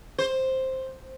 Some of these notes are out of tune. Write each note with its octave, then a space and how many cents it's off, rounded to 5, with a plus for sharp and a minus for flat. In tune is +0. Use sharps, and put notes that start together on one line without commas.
C5 +5